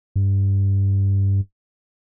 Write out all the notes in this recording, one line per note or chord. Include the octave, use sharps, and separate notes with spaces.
G2